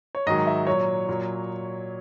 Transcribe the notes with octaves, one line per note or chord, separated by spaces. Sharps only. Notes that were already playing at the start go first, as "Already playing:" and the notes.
C#5
G#2 D#3 F#3 D#5
E5
A#2 F#3 C#5
A#2 F#3